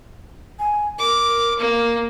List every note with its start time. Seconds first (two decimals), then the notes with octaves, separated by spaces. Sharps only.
0.59 G#5
0.99 A#4 D6
1.59 A#3